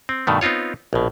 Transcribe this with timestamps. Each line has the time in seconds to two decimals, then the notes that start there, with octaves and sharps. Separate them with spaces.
0.09 C4
0.27 G2 B2 D#3 A3
0.41 B3 C4 D#4 F4 C#5
0.93 A#1 B2